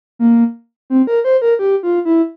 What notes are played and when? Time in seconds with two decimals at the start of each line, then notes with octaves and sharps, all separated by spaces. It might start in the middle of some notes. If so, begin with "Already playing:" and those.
0.19 A#3
0.90 C4
1.07 A#4
1.24 C5
1.42 A#4
1.59 G4
1.83 F4
2.05 E4